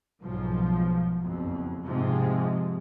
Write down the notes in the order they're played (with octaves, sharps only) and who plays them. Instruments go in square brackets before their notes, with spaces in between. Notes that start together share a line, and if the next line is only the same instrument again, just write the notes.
[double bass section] B1 G#2 F3
F#1 F2 B2
G#2 C3 F3 G#3